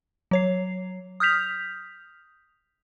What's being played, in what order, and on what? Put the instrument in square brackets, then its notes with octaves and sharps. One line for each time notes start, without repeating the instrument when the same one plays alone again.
[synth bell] F#3 C#5 C7
D#6 F6 G6 B6 F7